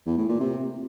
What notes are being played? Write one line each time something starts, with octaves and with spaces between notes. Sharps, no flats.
E2
A2
A#2
C3